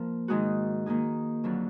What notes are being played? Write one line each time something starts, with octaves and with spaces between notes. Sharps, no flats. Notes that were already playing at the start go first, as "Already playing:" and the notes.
Already playing: F3 A#3 F4 A#4
G#2 D#3 G#3 D#4 F#4
D#3 A#3 D#4 G#4
F2 D3 F#3 D4 F4